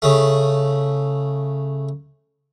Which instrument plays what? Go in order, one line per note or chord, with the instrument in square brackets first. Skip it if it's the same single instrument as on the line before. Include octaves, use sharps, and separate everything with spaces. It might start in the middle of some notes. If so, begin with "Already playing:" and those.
[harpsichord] C#3 A3